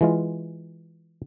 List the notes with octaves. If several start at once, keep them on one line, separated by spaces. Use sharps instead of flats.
E3 G#3 F4